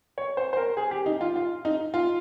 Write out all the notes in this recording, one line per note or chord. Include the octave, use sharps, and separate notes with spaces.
C#5
C5
C5
A#4
G#4
G4
D#4
F4
F4
D#4
F4